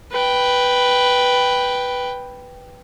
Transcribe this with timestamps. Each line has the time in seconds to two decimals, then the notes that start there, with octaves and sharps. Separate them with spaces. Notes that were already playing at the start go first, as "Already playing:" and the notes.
0.12 B4 G5